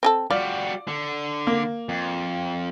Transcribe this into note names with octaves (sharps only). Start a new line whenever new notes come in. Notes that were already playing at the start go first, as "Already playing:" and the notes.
C4 G#4 A4
G3 F4 F#4 D5
D3
A#3
F2